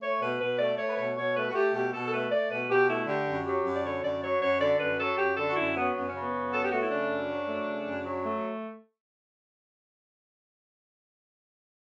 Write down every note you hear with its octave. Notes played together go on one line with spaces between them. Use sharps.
A3 C#5
B2 B4
B2 B4
A3 D5
A3 C#5
B4
B2 C#5
B2 C#5
A3 B4
F#4
A3 G4
B2 G4
B2 A4
A4
A3 B4
A3 D5
B2 B4
B2 G4
A3 E4
D3 G4
F#2
F#3 G4
F#2
D5
D3 C#5
F#2 D5
F#3 C#5
F#2 C#5
D3 D5
F#2 B4
F#3 A4
F#2 G4
D3 A4
F#4
F#2 E4
F#3 B3
F#2 B3
C#3 C#4
B3
F#2
F#3 A4
G4
A3 F#4
E4
C#3 D4
F#2
F#3
A3
C#3
F#2
F#3
A3